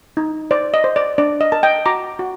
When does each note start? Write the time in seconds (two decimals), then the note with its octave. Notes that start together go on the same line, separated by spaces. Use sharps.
0.17 D#4
0.51 C5 D5
0.74 D#5
0.84 C5
0.96 D5
1.18 D4 D5
1.41 D#5
1.52 A#4 A5
1.63 D#5 G5
1.86 F#4 A#5 D6
2.19 F#4